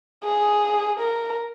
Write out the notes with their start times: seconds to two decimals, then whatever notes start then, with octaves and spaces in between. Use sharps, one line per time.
0.24 G#4
0.99 A#4